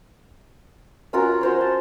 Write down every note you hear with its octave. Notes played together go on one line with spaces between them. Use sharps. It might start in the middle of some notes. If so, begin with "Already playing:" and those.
C#4 F4 F#4 A#4
F#4 C5 C#5
A5